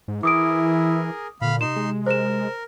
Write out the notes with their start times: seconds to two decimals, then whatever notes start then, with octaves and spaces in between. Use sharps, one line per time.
0.08 G#2
0.23 E3 E4 G#4 A#4 D6 D#6 D7
1.41 A#2 D3 F5 B5
1.61 C3 D#4 C6 E7
1.76 G#3
2.06 A#4 C5 E7